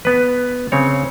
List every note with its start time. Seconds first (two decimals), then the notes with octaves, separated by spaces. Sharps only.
0.05 B3 B4
0.72 C#3 C4 C#5